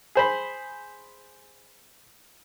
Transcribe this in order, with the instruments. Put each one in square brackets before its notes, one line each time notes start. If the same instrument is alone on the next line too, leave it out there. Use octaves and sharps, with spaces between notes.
[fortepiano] G#4 C5 B5